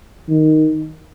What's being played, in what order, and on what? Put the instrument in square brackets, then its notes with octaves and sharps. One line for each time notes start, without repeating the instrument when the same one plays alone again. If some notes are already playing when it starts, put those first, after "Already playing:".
[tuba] D#3